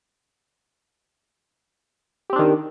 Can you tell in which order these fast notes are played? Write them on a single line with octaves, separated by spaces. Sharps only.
G4 C4 D4 D#3